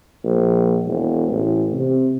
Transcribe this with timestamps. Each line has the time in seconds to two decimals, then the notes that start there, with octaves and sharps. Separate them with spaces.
0.24 A#1
0.85 E1
1.29 A1
1.73 C3